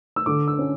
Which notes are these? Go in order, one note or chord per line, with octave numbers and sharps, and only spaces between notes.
E6
D3 D6
E6
C#4